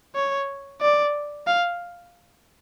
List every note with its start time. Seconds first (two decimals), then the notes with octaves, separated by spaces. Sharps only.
0.15 C#5
0.82 D5
1.47 F5